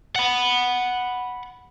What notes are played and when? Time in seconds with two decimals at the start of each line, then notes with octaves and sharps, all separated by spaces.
0.16 F#5 B5